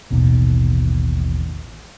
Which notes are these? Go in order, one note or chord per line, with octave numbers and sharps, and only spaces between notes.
A1 D#2 B2 D#3